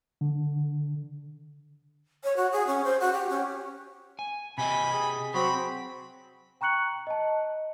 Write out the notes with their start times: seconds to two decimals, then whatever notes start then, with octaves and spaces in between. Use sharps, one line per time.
0.21 D3
2.24 C#5
2.36 F#4
2.52 G#4
2.67 C#4
2.84 C5
3.00 F#4
3.13 G4
3.30 C#4
4.19 G#5
4.58 C3 G4 D#5 G#5 B5
4.92 G#4
5.34 F#3 C4 F#4 B5
6.61 G5 A#5 C#6 F#6 C#7 F#7
7.07 D#5 A5